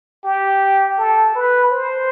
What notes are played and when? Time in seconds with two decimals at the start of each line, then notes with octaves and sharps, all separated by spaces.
0.24 G4
0.98 A4
1.35 B4
1.72 C5